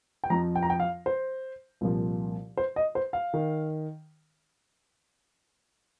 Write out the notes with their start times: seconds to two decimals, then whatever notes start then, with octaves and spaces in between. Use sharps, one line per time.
0.24 G5
0.30 F2 F3 A#5
0.55 G5
0.63 A#5
0.70 G5
0.80 F5
1.06 C5
1.81 C2 A#2 F3
2.57 C5
2.76 D#5
2.95 C5
3.13 F5
3.34 D#3